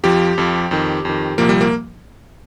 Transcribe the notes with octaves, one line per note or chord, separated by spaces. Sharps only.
F2 F3 G4
F2 F3
F2 D#3
F2 D#3
C2 A#2 F3 A#3
G3
A#3